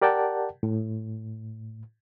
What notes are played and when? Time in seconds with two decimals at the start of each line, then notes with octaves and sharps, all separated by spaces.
0.02 G4 A#4 D5 F#5 G5 A5
0.63 A2